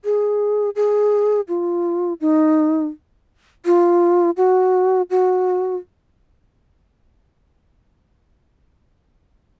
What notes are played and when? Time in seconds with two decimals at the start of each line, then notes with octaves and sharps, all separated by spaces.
0.05 G#4
0.76 G#4
1.48 F4
2.21 D#4
3.65 F4
4.37 F#4
5.10 F#4